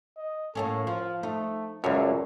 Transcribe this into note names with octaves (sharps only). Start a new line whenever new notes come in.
D#5
A2 A#3 C#4 A4
F3 F4
A3 D#4
C#2 F#2 C#5 D5 E5